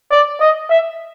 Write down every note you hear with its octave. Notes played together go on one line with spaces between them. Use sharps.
D5
D#5
E5